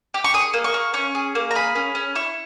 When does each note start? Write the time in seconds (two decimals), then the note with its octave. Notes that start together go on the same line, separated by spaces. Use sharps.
0.14 G4
0.24 C#6
0.34 G#4 D#6
0.53 A#3
0.64 C#6
0.74 A#3
0.94 C#4 C#6
1.15 G#4
1.35 A#3
1.51 A#5
1.55 G#4 B5
1.75 C#4
1.95 C#4
2.15 E4 C#6